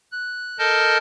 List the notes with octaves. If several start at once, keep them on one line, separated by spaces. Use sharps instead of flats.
F#6
A4 A#4 D#5 A5 F6 G6